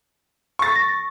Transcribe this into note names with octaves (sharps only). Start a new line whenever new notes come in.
C#6 A6
A#6